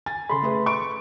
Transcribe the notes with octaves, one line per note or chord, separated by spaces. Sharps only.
G#5 A6
C#3 A4 B5 C6
A3 G#4 B4
C#6 D7